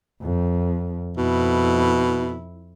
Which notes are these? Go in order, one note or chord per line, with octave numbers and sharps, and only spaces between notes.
F2
F2 B2 E4